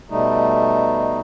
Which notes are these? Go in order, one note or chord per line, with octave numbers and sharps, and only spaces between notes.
B2 G3 A3 D#4